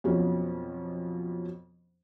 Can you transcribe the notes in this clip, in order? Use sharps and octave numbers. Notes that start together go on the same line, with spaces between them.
F2 B2 F3 F#3 C#4